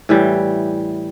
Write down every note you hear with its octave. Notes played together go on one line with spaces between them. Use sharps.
A2 E3 G3